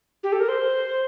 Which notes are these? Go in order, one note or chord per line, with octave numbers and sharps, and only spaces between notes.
G4
A4
A#4
C5